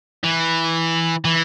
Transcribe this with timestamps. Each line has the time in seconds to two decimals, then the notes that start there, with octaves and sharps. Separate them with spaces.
0.24 E3
1.25 E3